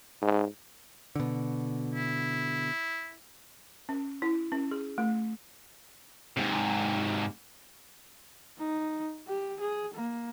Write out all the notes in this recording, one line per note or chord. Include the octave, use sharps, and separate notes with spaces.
G#2
B2 D3
E4
C#4
E4
C#4
G#4
A3
G#2 C3
D#4
G4
G#4
A#3